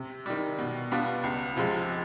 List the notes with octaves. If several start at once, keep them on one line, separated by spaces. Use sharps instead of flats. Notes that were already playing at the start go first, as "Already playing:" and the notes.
Already playing: C3
D#3 G3
B2
G3 B3 D4 F4
C#2
C3 F3 G#3